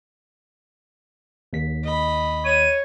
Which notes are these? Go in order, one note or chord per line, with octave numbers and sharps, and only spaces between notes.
D#2 B6
D#5 B5
C#5 D#7